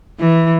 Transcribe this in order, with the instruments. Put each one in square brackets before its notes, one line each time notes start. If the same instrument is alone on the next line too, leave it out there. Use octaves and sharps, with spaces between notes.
[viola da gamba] E3